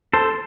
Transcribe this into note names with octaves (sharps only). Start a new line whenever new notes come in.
A4 C5